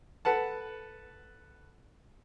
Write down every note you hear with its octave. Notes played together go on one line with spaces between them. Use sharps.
A4 B4 F#5 A5